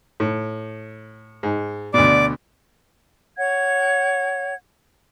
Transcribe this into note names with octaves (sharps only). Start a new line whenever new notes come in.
A2
G#2
D2 B2 D5 D6
C#5 F#5 G#6